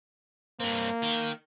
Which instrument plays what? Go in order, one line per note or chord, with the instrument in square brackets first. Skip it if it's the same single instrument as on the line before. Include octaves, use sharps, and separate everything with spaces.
[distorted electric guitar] G2 C4 [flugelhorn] A#3
[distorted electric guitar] D#3